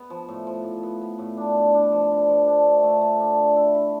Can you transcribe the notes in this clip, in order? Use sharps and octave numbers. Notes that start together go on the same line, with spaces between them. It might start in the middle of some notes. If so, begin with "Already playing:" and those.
Already playing: B3
F3
A2
F3
A2
B3
B3
A2
D4
D4
D4
F3
D3
F3
D4
A3
A3
A3
D4
D3
E4
E4